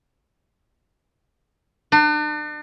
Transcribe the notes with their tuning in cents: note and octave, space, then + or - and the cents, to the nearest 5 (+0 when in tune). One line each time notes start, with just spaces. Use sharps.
D4 +40